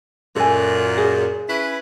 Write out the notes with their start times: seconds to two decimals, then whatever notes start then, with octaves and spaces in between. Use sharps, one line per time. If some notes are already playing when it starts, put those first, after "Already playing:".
0.36 F#2 A#2 A4 D#5 G#5
0.98 G#4
1.49 C#4 E4 B4